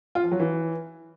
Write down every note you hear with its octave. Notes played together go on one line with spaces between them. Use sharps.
F4
F3
F#3
E3